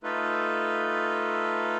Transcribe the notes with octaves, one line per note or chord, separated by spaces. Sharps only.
A3 D#4 F4 A4 B4